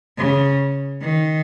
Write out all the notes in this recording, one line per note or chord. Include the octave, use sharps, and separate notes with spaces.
C#3
D#3